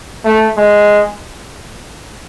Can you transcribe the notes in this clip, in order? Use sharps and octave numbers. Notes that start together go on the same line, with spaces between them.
A3
G#3